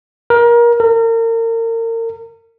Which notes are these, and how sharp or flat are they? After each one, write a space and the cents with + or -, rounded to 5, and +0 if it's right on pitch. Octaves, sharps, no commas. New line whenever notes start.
A#4 +25
A#4 -35